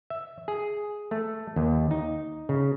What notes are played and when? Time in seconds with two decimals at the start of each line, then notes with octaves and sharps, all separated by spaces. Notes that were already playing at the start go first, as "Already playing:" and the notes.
0.10 E5
0.48 G#4
1.11 A3
1.56 D#2
1.91 D#4
2.49 C#3